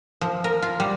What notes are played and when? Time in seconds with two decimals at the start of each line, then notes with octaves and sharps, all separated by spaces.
0.21 F3
0.44 A#4
0.62 F4
0.80 G3